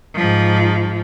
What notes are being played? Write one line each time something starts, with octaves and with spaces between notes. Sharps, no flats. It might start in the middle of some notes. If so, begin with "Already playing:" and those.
G#2 F3